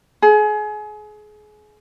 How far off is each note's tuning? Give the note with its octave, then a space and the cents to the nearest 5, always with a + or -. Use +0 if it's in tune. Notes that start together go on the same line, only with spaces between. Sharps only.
G#4 +30